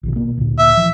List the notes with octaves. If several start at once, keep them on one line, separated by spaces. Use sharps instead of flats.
A#1 B2 D#3
B2 A#3
D2 A#2
E5
E3 F3